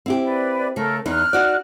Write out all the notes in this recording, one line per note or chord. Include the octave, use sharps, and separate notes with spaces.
C4 E4 G4
B4 D5
C#3 A3 A4 A#4
E2 D#4 F6 F#6
D#4 F#4 D5